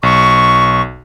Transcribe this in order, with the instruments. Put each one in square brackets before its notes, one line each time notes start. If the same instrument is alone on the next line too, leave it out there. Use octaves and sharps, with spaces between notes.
[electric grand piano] B1 [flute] C#6